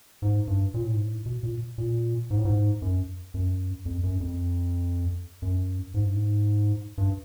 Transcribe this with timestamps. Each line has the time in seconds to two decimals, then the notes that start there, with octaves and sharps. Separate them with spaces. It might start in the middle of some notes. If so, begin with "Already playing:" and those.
0.22 G#2
0.48 G2
0.74 A#2
0.83 A2
0.94 G#2
1.03 A2
1.26 B2
1.43 A#2
1.78 A#2
2.30 G#2
2.37 A2
2.45 G#2
2.82 F#2
3.34 F#2
3.85 F2
4.03 F#2
4.20 F2
5.42 F#2
5.94 G#2
6.04 G2
6.14 G#2
6.98 G2